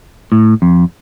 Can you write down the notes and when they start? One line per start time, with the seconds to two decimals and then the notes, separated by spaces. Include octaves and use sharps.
0.32 A2
0.62 F2